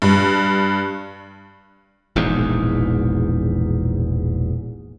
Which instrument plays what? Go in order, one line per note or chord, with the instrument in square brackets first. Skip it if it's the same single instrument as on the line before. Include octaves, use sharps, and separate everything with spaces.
[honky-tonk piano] G2
[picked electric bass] E1 A#1 E2 G#2